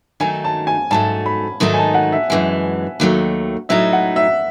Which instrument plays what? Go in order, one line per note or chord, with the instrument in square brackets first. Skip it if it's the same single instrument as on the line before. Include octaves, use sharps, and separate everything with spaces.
[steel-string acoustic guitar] D#3 F#3 A3 D#4 [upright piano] G#5
[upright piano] A5
G#5
[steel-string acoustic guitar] G#2 F#3 A3 [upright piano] A5
[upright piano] B5
[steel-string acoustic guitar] G#2 D#3 F#3 A3 D#4
[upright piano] G#5
A5
F#5
E5
[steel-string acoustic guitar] F#2 E3 G#3
D#2 D#3 F#3 A3
[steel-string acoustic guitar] A2 F#3 A3 D#4 [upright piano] E5
[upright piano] F#5
E5